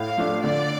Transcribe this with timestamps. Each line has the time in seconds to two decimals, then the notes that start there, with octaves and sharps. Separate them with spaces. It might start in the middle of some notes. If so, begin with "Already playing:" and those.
Already playing: A2 F5
0.18 F3 A3 D4
0.43 D3 D5